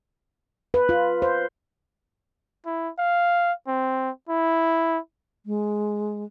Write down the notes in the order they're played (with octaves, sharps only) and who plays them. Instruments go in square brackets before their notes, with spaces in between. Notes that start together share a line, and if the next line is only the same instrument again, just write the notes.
[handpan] B4
F4
C5
[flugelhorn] E4
F5
C4
E4
[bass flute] G#3